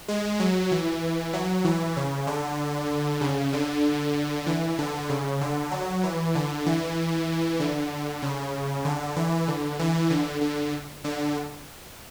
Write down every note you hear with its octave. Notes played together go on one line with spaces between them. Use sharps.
G#3
F#3
E3
F#3
E3
C#3
D3
C#3
D3
E3
D3
C#3
D3
F#3
E3
D3
E3
D3
C#3
D3
E3
D3
E3
D3
D3
D3